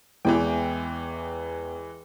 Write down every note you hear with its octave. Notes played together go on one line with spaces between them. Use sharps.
E2 E3 G#3 G5